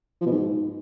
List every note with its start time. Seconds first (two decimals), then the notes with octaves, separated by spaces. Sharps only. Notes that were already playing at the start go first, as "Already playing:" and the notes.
0.21 F3
0.26 B2
0.31 G#2